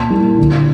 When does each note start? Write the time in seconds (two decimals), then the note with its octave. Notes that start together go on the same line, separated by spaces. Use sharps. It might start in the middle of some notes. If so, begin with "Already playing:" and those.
Already playing: A#2 A5 C6
0.10 G3 A#3 E4
0.38 D3